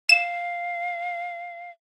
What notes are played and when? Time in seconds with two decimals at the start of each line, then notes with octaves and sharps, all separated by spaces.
0.09 F5 E7